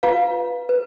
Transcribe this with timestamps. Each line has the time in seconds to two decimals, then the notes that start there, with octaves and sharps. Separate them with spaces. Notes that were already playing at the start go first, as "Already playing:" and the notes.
0.03 F4 B4 F5
0.69 B4